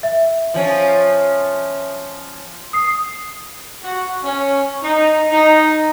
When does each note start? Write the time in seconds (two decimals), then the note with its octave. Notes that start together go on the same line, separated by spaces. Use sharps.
0.03 E5
0.54 F3 C#4
2.73 D#6 C7
3.83 F#4
4.22 C#4
4.82 D#4
5.31 D#4